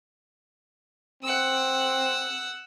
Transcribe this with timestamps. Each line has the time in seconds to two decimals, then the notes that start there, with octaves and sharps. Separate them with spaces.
1.23 C4 F#5 E6